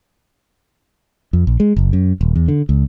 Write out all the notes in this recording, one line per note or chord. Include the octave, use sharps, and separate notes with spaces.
F2
A#1
G#3
F#1
F#2
D#1
E2
D3
C#2